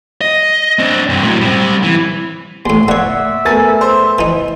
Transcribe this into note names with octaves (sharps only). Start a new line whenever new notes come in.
D#5
C4 D4
G2 C3
A2 F#3
G3 C4
E3
D#2 A2 C6
A#3 C#5 D5 E5 F#5
A3 B3 A#4 G#5 A6
C5
E3 D#4